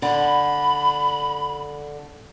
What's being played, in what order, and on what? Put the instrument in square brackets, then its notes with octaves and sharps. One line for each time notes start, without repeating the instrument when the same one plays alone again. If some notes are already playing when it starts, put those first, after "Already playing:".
[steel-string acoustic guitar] D3 [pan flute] B5